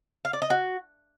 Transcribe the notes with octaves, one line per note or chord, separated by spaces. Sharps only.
F5
D5
D#5
F#4